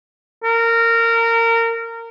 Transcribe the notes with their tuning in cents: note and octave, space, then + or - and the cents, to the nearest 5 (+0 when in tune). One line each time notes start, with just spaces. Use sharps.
A#4 -20